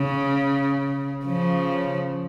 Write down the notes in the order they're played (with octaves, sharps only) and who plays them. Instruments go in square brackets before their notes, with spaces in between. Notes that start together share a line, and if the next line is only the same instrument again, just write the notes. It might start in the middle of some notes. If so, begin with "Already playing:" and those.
Already playing: [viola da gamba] C#3
C#3 F3